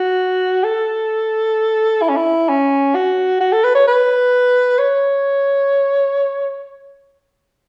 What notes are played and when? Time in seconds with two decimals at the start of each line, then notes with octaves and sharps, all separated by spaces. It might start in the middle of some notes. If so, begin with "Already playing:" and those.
Already playing: F#4
0.64 A4
2.02 E4
2.09 C#4
2.17 E4
2.49 C#4
2.95 F#4
3.41 F#4
3.53 A4
3.64 B4
3.75 C#5
3.88 B4
4.79 C#5